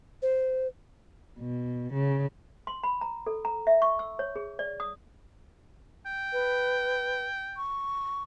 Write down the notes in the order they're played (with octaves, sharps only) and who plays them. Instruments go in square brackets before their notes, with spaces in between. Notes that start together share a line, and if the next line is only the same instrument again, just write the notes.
[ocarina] C5
[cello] B2
C#3
[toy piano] C6
B5
A#5
A4
A#5
E5
C#6
E6
C#5
G#4
D5
D#6
[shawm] G5
[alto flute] B4
C#6